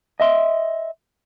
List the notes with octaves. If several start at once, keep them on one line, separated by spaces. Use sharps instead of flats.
D#5 E5 C6